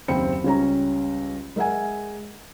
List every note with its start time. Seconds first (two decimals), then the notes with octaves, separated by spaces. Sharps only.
0.08 F#1 D#2 C4 G5 B5 C#7
0.44 C#2 G3 C#4 A#5
1.56 G#3 A#4 E5 F#5 G#5